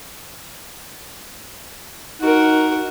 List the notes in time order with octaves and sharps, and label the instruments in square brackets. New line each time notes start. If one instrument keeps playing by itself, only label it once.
[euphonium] D#4 [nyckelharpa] F#4 A#4